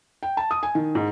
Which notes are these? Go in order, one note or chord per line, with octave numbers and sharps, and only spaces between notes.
G5
A5
D#6
G#5
D#3
G#2